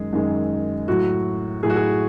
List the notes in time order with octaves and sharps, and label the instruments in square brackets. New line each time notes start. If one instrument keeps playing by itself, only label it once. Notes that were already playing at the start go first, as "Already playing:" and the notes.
Already playing: [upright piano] F#2 D#3 G#3 G#4
F#2 D#3 G#3
A2 F#3 F#4
A2 G#4
F#3 F#4
G#4